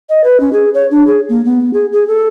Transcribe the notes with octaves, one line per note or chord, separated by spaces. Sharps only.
D#5
B4
C#4
G#4
C#5
D4
G#4
A#3
B3
G#4
G#4
A4